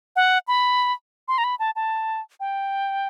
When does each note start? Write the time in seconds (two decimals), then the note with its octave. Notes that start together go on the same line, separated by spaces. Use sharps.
0.16 F#5
0.48 B5
1.28 C6
1.38 A#5
1.44 B5
1.59 A5
1.76 A5
2.40 G5